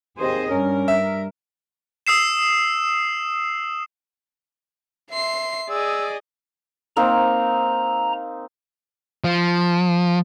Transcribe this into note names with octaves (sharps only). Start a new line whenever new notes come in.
D#2 C4 G#4 C5 D#5
G2 C#4 A#4
E5
D#6 E6 C7 E7
E5 C6 C7
G#4 D5 D#5 E6
A#3 C4 D#4 A#5
F3